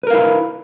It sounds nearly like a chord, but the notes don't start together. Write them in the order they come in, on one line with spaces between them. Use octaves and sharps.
B4 A#4 F5 E4